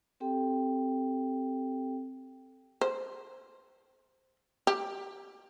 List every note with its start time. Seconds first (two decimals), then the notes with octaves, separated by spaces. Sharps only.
0.20 C4 G4 A4 G5
2.81 C5
4.67 G4